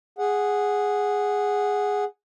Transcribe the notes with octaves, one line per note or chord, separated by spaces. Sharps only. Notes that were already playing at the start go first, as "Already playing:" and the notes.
G#4 F#5